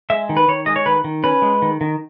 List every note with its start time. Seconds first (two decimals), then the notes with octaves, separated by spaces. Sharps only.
0.10 G#3 E5
0.29 D#3
0.37 B4
0.48 D#3 C#5
0.66 G#3 D#5
0.76 C#5
0.86 D#3 B4
1.04 D#3
1.24 C#4 B4
1.42 G#3
1.62 D#3
1.81 D#3